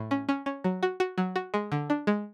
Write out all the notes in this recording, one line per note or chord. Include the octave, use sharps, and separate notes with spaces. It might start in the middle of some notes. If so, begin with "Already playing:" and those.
Already playing: A2
C#4
C#4
C#4
F#3
F#4
F#4
F#3
F#4
G#3
D3
D4
G#3